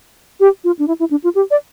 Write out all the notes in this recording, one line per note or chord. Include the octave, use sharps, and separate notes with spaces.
G4
F4
D4
E4
E4
D4
F4
G4
D5